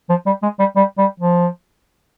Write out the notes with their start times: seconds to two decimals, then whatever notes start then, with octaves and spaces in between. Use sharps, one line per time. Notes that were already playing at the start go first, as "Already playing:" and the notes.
0.09 F3
0.26 G3
0.42 G#3
0.59 G3
0.76 G3
0.98 G3
1.20 F3